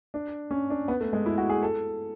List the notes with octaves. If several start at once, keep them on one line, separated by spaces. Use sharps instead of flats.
D4
C#4
D4
B3
A3
G#3
E4
F#4
G#4
A4